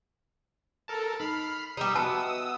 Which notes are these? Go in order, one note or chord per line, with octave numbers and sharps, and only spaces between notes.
A4 A#4 A5
D#4 B5 F6 C7
G3 D#4 G4 D#6 E6
B3 F#4 D#5 E5 A5